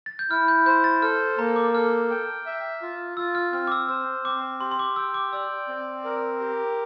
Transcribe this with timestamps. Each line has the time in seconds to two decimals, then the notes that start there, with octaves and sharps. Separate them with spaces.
0.06 A6
0.19 G6
0.31 E4 F6
0.48 G6
0.66 C5 G6
0.84 A6
1.02 A4 F6
1.38 A#3 A#5
1.56 D6
1.74 A4 F6
2.10 G5
2.46 E5
2.82 F4
3.17 F4 E6
3.35 F6
3.53 C4 F6
3.67 D6
3.72 E6
3.89 C5 E6
4.25 C4 D6
4.61 G4 C6
4.71 C6
4.79 D6
4.96 G5 E6
5.14 D6
5.33 D5 E6
5.68 C4
6.04 A#4
6.40 G4